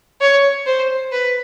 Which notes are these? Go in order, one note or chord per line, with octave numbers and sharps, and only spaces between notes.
C#5
C5
B4